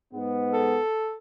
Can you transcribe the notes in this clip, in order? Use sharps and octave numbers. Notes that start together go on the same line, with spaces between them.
G#2 G#3 B3
A4